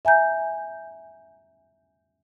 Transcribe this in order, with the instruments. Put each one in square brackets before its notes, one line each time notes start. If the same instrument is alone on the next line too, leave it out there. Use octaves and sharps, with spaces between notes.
[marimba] E5 G#5 A#5 G6